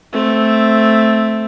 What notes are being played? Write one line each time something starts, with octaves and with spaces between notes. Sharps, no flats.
A3 C4